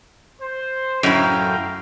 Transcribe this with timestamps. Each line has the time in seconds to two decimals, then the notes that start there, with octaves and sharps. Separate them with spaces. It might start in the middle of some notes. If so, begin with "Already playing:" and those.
0.41 C5
1.03 F#2 A2 F5 G5 A#5